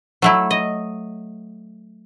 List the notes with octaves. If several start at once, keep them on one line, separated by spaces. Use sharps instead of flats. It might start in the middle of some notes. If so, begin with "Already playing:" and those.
F#3 A3 E4
D#5